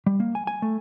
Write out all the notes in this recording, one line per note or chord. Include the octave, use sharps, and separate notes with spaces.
G3
A#3
G#5
G#5
A3